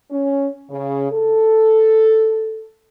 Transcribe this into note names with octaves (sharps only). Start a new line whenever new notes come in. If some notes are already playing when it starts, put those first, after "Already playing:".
C#4
C#3
A4